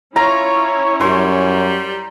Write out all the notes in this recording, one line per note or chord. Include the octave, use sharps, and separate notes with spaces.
C#4 E4 F4 C#5 A#5
F#2 G3 C6